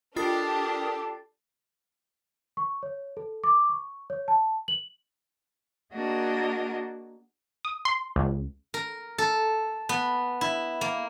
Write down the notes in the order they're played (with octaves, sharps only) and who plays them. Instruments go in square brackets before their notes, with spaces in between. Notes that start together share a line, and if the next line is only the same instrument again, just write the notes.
[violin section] D4 G4 [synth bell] F4 A6 C7 [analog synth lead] A4 [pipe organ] A#4 D#6
[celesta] C#6
C#5
A4
D6
C#6
C#5
A5
F#7
[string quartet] A#3 D4 F#4 G#4 A#4 D#5
[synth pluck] D#6
C6
C#2
[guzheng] A#4
A4
B3
E4
A#3